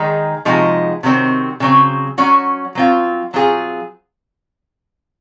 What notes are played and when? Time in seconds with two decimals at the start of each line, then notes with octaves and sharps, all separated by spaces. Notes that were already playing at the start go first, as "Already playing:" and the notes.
Already playing: D#3 G#3 D#4 G#4
0.45 C3 F3 G#3 D#4 F#4
1.03 C3 D#3 F#3 C4
1.60 C#3 F#3 C4
2.18 F#3 C#4 F#4
2.75 F#3 C4 F4
3.34 F#3 C4 F4 G#4